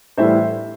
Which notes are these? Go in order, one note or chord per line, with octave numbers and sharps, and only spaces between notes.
A2 E3 G3 C5 E5